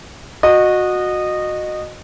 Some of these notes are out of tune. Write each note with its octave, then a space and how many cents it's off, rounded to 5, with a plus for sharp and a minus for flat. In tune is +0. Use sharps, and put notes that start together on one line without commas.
F#4 -20 D#5 -20